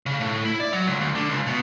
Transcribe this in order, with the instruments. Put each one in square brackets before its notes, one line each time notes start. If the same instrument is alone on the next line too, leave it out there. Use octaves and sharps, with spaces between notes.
[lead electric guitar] C#3
A2
E4
D5
F#3
C#2
D2
D3
C#2
B2